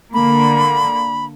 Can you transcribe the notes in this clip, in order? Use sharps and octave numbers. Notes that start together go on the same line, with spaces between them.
D3 A#3 B5